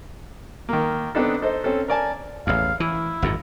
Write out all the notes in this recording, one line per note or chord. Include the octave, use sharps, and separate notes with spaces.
D#3 A#3
B3 C4 D4 D#4 A4
D#4 A4 C5 D#5
C4 C#4 A4 C5
A#4 D5 G#5 A5
A1 E2 F5
E3 E4
G#1 F#2 A#2